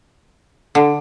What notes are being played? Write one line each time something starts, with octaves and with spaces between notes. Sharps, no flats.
D3